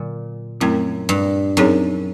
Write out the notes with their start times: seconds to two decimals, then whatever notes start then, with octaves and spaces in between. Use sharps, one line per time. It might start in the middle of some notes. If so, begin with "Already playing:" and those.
Already playing: A#2 D3 F#3
0.61 F#2 A3 C4 E4
1.09 G2
1.57 F#2 C4 D#4 G#4 C#5